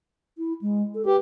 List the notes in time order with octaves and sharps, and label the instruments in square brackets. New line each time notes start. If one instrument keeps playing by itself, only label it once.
[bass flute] E4
G#3
A4
[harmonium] G4 [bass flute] B4